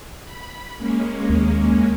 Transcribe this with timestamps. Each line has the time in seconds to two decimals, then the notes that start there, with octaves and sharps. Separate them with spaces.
0.24 B5
0.77 G#3 A#3 C#4
1.30 D#2